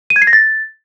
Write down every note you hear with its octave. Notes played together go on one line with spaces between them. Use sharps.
D#7
G#6
C7
A#6
A6